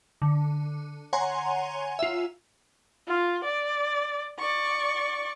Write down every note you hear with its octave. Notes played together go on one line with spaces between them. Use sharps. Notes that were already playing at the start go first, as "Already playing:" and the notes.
D3
C#5 F#5 G#5 A#5 C6
F4 E5
F4
D5
D5 C#6